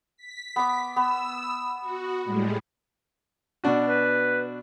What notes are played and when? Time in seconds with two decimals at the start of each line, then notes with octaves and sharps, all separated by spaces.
0.17 B6
0.56 B3 D6
0.96 B3 E6
1.81 F#4
2.24 A2 G3 G#3
3.64 B2 D4 F#4
3.86 B4